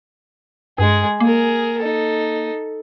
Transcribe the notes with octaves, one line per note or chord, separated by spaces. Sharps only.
G2 G#3 G#4
A#3 G#4 A#4
D#4 A4